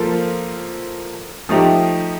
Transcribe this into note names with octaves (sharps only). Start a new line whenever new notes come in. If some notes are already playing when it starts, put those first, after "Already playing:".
Already playing: F3 A#3 F4 A4 C5
F3 A3 D#4 G4